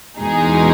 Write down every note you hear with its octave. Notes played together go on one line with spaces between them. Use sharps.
E2 B2 G#3 D#4 G#4